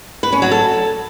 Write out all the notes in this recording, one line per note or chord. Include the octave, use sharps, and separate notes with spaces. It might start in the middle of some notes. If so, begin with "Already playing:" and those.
B4
C#4
F#3
A4